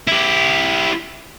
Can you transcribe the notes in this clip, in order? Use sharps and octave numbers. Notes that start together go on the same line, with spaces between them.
E4 G4